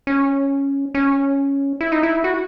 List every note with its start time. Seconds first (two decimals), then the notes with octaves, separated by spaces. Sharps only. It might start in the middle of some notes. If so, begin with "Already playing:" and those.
0.07 C#4
0.95 C#4
1.81 E4
1.92 D#4
2.03 E4
2.24 F#4